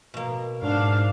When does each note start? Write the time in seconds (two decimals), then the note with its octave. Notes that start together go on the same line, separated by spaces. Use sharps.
0.14 B2 A#3
0.62 G#2 D4 F5